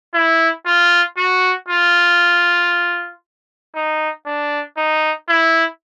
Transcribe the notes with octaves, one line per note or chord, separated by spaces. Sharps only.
E4
F4
F#4
F4
D#4
D4
D#4
E4